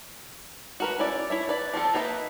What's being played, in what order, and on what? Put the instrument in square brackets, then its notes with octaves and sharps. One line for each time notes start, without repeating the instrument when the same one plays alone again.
[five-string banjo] F#4 A#4 B4
C#4 E4 D5
E4 C#5 E5
B4 D5
F3 C4 F4 A4
A#3 D#4 B4 C#5 E5